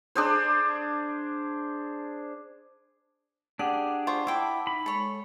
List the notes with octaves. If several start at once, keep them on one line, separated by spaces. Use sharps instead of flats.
D4 G#4 C5
D4 G4 G#4 F#5
F4 C5 C#6
E4 F#5 G5 A5 D6
D#4 B5
G#3 A4 C#5